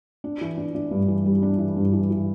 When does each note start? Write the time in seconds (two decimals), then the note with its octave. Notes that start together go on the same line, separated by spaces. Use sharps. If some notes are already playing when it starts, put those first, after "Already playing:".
0.24 D4
0.41 E3
0.57 D4
0.75 D4
0.91 G2
1.08 E3
1.26 G3
1.42 D4
1.59 E3
1.77 G2
1.93 E3
2.10 E3